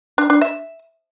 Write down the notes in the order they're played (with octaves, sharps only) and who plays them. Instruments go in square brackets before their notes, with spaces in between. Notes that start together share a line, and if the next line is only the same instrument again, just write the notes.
[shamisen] D4
D4
E5